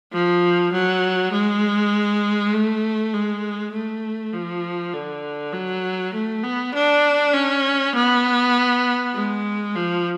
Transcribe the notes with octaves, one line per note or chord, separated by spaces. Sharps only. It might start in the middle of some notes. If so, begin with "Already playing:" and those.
F3
F#3
G#3
A3
G#3
A3
F3
D3
F#3
A3
B3
D4
C#4
B3
G#3
F3